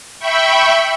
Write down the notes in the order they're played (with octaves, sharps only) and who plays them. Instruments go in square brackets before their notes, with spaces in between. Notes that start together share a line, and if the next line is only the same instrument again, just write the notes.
[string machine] E5 G5 B5 C#6